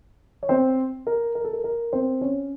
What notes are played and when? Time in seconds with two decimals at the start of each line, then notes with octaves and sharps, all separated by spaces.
0.43 C#5
0.49 C4 C5
1.07 A#4
1.35 A#4
1.44 A4
1.53 A#4
1.64 A#4
1.93 C4 C5
2.21 C#4 C#5